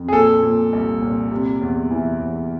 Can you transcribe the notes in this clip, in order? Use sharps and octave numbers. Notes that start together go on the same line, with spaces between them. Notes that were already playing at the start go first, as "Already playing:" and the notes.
Already playing: F2
G#4
A#2 A4
A#2
C2
A#2
C3
E2
E3
E2